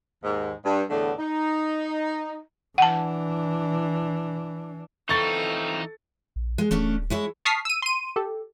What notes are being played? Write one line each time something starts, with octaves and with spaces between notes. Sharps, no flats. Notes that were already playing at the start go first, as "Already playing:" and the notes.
D#2 G#2
G2
E2 A2 D3 A3 B3 D4
D#4
E3 D4 F#5 A5
E3 C4 D#4 F4 A4 C#6 A6
A#1
G#3
D1 A3 C#4 D4
G#3 E4 C#5
A5 C#6 D#6 F6 B6 C7
E6 D#7
C6 D#7
G4 A4